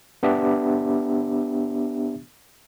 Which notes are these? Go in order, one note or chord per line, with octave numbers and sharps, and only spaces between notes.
B3 D4 G4 E5